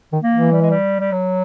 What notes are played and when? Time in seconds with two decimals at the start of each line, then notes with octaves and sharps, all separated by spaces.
0.12 D#3
0.22 A#3
0.32 E3
0.52 G3
0.62 G#3
0.70 G3
1.00 G3
1.12 F#3